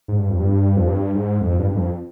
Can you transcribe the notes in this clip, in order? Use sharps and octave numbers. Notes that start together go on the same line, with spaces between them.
G#2
G2
F2
G2
F2
G2
G#2
F2
G2
G2
F2